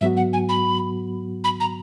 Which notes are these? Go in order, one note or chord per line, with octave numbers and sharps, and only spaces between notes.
G#2 F#3 B3 F#4 E5
F#5
G#5
B5
B5
A#5